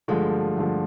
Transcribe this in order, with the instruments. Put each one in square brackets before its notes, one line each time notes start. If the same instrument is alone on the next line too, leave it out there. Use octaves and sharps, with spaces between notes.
[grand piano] G2 D3 F3 A3 [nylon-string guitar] G#3
[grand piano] G2 D3 F3 A3